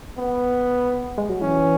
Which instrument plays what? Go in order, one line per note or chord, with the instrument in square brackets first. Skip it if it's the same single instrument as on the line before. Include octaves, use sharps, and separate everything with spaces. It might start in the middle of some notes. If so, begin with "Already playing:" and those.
[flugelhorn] B3
[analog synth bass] G#3
F#3
[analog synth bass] E3 [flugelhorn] C#4